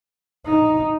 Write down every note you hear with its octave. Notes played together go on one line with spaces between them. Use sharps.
D#4